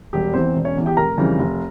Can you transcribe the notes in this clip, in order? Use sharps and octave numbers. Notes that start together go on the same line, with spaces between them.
E1 G3 G4
E2 E3 C4 C5
E1
C#4 C#5
E2 E3
G4 G5
F1 A#4 A#5
F2 C#3 E3 G3
F1